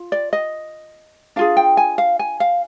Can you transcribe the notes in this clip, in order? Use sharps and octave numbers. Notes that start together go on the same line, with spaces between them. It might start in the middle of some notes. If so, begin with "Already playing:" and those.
Already playing: F4
D5
D#5
D4 F4 G#4 F5
G5
G#5
F5
G#5
F5